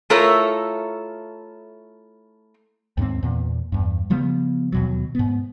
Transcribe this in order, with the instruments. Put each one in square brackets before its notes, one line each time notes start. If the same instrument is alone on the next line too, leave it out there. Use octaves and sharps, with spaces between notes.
[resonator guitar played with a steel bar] A3 E4 F4 A4 A#4 C#5
[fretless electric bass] D#2 G#2 G3 C4
E2 A#2
E2 G2
C#3 F3 G3 B3
D#2 B2 F#3
G#2 B3